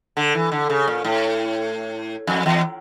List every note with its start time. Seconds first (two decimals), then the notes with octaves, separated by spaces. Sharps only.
0.17 D3
0.35 E3
0.52 D3
0.70 C#3
0.88 A#2
1.05 A2
2.27 F2
2.46 E2